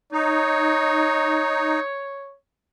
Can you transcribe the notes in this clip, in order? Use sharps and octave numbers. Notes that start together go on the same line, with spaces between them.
D#4 C#5